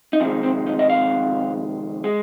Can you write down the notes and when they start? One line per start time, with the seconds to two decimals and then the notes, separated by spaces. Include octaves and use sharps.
0.13 D#4
0.20 F2 C3 D#3 G#3 C4
0.43 C4
0.67 D#4
0.79 D#5
0.89 F5
2.04 G#3